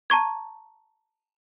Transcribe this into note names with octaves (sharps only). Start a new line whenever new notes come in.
A5 A#5 C#6 G#6